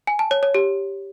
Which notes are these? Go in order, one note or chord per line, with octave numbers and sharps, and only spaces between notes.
G#5
A5
C#5
C#5
G4